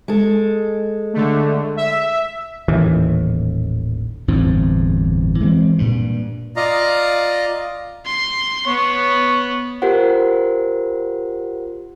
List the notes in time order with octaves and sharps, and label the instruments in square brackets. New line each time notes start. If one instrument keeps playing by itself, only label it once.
[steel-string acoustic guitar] G#3 A4
[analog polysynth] D3 A3
E5
[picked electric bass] D#1 A1 D#2 E3
[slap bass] G1 E2 A2 C4
E3 G#3 A3 C4
G2 A#2
[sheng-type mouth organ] F4 D5 D#5 F5 A#5
[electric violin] C6
[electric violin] B3 [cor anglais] C#5
[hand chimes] F4 G4 A#4 C5 F#5